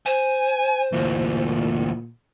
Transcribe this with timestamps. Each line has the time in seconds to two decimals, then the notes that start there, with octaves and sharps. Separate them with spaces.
0.06 C5 G#5
0.93 D2 A#2 E3